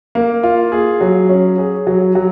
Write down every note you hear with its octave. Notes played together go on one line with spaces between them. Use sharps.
A#3
F4
G#4
F#3
C#4
G#4
F#3
F#3